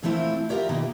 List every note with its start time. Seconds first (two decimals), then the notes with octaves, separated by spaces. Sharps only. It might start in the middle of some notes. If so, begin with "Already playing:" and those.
0.02 A#2 E3 A3 C4 E4 F4
0.49 F4 G4 A#4 C#5 E5
0.69 B2 D#3 A#3